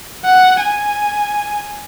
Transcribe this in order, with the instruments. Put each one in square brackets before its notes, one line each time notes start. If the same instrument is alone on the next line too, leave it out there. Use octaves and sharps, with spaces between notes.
[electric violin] F#5
G#5